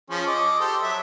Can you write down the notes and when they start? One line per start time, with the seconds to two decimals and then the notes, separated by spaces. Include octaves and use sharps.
0.11 F3 C#4 G#4
0.27 D#5 D6
0.60 G4 A4 C5
0.83 F#3 E5